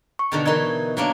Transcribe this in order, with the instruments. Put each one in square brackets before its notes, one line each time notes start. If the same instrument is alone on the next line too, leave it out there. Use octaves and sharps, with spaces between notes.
[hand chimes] C#6
[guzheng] B2 D3 D#3
[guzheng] E3 D#4 [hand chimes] A#4 D#5 G#6
[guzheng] F#3 A#3 D4